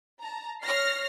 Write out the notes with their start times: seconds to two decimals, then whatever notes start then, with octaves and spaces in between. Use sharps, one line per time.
0.21 A5 A#5
0.63 C#5 F6 A#6 C7